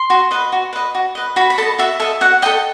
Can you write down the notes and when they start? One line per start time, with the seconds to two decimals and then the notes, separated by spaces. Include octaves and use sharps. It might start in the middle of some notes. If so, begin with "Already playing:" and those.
Already playing: C6
0.10 F#4
0.31 B4 D#5
0.52 F#4
0.73 B4 D#5
0.95 F#4
1.15 B4 D#5
1.36 F#4 B5
1.50 B5
1.58 A4 D#5 A5
1.78 F#4 E5
2.00 A4 D#5 E5
2.21 F#4 F#5
2.42 A4 D#5 G5